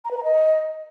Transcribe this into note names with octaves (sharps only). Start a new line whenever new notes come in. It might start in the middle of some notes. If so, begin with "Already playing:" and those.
A#5
B4
A#5
D#5